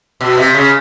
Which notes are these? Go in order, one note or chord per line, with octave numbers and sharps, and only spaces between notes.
B2
C3
C#3